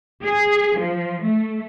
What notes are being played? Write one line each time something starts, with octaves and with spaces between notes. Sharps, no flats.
G#4
F3
A3